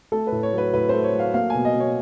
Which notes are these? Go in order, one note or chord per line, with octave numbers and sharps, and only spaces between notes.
A3 A4
B4
A2
C#5
F#3 B4
A2 B4
A3 C5
C#5
F#3 F5
A#3 F5
B2 G#5
D#5
B2
C#5